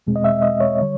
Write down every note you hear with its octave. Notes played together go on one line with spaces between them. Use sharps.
E2 B2 G#3 C4
D#5
E5
D#5
C#5
D3 G3